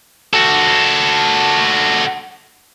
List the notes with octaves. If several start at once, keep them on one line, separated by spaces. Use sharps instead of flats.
F#4 A4